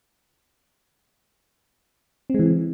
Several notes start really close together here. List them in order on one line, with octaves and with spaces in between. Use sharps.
C4 G#3 E3